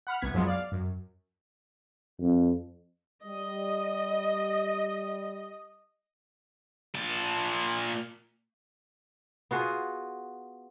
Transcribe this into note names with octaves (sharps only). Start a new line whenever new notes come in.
F#5 B5 F6
C2 B3 G#6 B6
F#2 F3 F#3 G#3 B3
D5 F5
F#2
F2
G3 D#5
A#2 A5
B3 F4 F#4 G#4